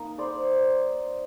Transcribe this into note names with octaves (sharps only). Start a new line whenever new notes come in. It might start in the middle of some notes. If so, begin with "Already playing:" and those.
Already playing: A#3 D#4
C5 D5